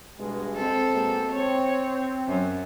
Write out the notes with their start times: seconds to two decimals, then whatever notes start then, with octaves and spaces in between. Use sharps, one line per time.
0.18 G2 B2 G#3
0.56 C4 A4
0.92 B2 G#3 A#3
1.32 C4 C#5
2.27 F#2